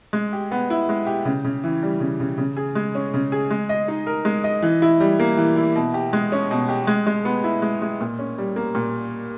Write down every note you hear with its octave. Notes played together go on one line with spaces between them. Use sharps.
G#3
G4
B3
E4
G#3
G4
C#3
C#3
E3
G3
C#3
C#3
C#3
G#4
G#3
C#4
C#3
G#4
G#3
D#5
D#4
A#4
G#3
D#5
E3
E4
G3
A#3
E3
E4
B2
G4
G#3
C#4
B2
G4
G#3
G#3
B3
E4
G#3
G#3
A#2
C#4
G3
A#3
A#2